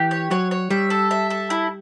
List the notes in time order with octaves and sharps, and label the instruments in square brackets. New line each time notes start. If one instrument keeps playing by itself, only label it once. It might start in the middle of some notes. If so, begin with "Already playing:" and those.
Already playing: [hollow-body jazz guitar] E3 [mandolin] G4
[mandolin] C#5
[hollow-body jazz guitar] F#3 [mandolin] C#5
[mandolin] C#5
[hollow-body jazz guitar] G3 [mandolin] E5
[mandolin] A4
E5
A4
E4